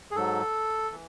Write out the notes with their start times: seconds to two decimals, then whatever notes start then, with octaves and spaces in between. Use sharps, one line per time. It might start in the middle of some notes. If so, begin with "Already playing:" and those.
0.11 G#4
0.15 G#2 F#3 A4
0.92 E3